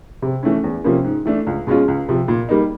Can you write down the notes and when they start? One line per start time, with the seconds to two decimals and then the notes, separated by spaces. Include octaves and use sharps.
0.22 C3
0.43 E3 A3 C#4
0.64 E2
0.84 C3 F3 A#3 C#4
1.04 G#2
1.25 E3 A3 D4
1.47 C#2
1.67 B2 G#3 C#4 F4
1.88 C#2
2.09 C3 F3
2.28 A#2
2.49 G3 A#3 D#4